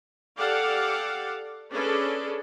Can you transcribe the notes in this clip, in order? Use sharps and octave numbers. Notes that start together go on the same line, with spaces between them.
G4 A4 D5 F5 F#5
C#4 D4 G#4 A4 B4